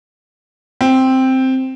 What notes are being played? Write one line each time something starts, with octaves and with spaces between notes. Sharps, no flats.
C4